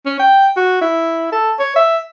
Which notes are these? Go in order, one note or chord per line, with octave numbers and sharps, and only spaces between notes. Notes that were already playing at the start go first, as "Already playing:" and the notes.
C#4
G5
F#4
E4
A4
C#5
E5